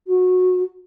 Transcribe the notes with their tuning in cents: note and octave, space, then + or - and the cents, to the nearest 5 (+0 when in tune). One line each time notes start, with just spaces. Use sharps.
F#4 -20